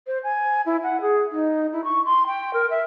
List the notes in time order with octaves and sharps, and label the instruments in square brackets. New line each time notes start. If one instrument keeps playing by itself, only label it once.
[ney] C5
G#5
E4
F#5
G#4
D#4
E4
C#6
C6
G5
A#4
E5